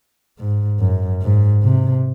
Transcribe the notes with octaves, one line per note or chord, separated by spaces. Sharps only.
G#2
F#2
G#2
C3